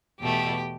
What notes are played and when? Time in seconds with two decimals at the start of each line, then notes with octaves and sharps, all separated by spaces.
0.19 E2 B2 A3 G4